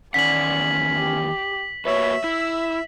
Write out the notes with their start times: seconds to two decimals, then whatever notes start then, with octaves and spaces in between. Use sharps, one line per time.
0.14 E2 D#3 C#4 D5 F#5 B6 F#7
0.96 G4
1.85 A#3 F#4 B4 C#5 E5
2.24 E4 E6